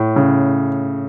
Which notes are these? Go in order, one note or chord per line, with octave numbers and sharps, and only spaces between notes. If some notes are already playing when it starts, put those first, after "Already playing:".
Already playing: A2
C#3